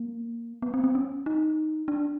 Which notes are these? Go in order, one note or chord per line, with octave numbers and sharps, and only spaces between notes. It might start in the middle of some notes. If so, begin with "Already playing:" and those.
Already playing: A#3
B3
C4
C4
C#4
D#4
D4